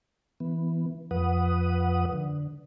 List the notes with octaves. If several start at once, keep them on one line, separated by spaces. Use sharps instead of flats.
E3 B3
F2 F3 B4 F#5 D#6
D3